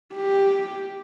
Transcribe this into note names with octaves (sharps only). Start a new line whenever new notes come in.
G4